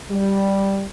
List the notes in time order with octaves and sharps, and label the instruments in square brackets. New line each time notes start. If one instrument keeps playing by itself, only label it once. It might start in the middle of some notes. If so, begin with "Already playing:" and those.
[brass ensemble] G3